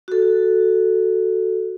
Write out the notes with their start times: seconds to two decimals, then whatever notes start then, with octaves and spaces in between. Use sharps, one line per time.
0.08 F#4 A4